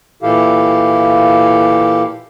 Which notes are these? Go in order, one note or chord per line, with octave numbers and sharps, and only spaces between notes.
A#2 E3 E4 G4 A4 F5